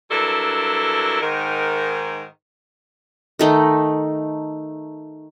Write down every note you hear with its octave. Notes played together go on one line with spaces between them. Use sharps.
G2 F#3 D4 E4 A4 A#4
G#2 D#3 A#4
D#3 A3 D#4